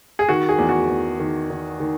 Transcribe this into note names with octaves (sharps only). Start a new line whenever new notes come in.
G#4
D#3 F#4
G#4
E2
F#4
E2
D#3
D#3
D#3